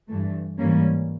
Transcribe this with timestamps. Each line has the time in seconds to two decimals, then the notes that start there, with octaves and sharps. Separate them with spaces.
0.09 G2 E3 A3
0.58 G#2 E3 G3 A#3 C#4